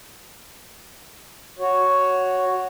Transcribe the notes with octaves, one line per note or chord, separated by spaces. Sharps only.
F#4 C#5